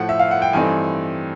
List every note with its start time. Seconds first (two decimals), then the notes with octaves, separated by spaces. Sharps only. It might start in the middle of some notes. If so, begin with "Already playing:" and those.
Already playing: A2 F3 A3 F#5
0.09 E5
0.19 F5
0.31 F#5
0.42 G5
0.53 G2 E3 A3 C4 D#4 G#5